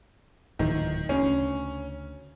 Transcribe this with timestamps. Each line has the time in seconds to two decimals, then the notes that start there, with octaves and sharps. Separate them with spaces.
0.59 D1 A#2 D#3 E3
1.09 D2 C#3 C#4